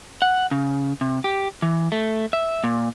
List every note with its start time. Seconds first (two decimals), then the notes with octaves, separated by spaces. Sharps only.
0.22 F#5
0.51 C#3
1.01 C3
1.24 G4
1.62 E3
1.92 A3
2.33 E5
2.64 A#2